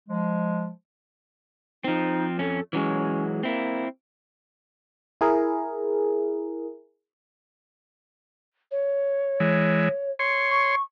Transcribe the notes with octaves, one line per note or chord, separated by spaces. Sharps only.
F3 G#3
F3 C4 D#4
F2 C#4 A4
E3 F#3 G#3 C#4
A#3 C4 E4
E4 G#4 A#4
C#5
E3 G#3
C#5 C6
C#6